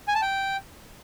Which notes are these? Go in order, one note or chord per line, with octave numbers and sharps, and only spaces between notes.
G#5
A5
G5